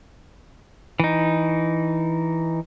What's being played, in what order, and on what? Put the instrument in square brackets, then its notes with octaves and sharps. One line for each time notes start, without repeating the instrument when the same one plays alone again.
[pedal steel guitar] E3 D#4